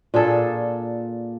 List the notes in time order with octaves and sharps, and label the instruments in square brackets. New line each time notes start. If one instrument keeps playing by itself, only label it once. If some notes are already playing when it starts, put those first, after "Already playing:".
[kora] A#2 D4 G#4 A4